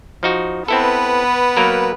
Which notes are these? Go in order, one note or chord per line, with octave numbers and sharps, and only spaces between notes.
F3 D#4 F#4
B3 C4 E4 A4 B4
F#3 A#3 A#4